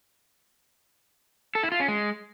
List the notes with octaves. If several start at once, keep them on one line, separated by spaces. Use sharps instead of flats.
A4
E4
F4
C#4
G#3